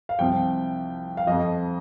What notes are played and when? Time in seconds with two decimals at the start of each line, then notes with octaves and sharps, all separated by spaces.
0.09 F5
0.19 C2 C3 F3 G5
1.17 F5
1.27 F2 F3 D#5